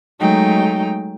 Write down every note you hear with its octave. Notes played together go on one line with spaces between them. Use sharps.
F#3 G#3 A3 D#4 G5